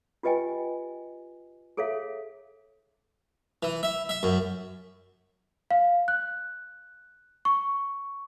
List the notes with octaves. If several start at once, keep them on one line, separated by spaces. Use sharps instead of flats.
F4 G4 B4 D#5 G5 G#5
G#4 A4 C#5 E5 F5
E3
E5
E5
F#2
F5
F#6
C#6